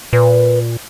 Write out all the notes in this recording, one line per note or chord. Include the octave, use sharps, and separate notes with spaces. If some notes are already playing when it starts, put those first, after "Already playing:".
A#2 B4